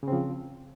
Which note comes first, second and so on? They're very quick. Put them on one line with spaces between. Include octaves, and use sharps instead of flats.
C#3 C4 F3